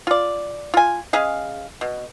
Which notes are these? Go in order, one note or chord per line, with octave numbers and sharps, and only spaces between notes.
F4 D5
F4 G#5
G#3 C#4 G#4 F5
B2